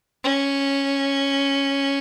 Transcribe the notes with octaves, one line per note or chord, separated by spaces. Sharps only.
C#4